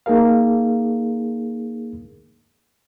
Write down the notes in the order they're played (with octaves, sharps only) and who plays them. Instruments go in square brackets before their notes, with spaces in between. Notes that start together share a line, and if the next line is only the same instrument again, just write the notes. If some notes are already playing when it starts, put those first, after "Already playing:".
[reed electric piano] A#3 D#4 G#4 A#4 F5